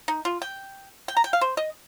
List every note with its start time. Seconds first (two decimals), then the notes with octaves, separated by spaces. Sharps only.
0.08 D#4
0.25 F4
0.42 G5
1.08 G5
1.17 A#5
1.24 G5
1.33 F5
1.41 C5
1.57 D#5